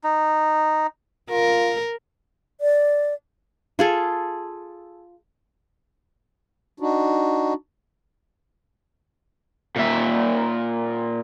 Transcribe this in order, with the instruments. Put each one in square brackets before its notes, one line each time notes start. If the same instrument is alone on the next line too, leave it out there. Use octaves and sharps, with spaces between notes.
[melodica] D#4
[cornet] F4 [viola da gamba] A#4
[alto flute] D5
[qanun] F4 G#4 A4
[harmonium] D4 D#4 F#4
[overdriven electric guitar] A#2 E5